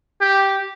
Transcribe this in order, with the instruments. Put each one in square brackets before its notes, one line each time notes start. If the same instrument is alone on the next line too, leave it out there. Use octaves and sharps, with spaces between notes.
[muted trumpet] G4